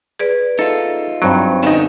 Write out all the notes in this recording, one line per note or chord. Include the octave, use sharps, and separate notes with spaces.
G#4 B4 D5
D#4 F4 A4
G2 F#3 C4 C5 C#5
D3 B3 C#4 D#4 E7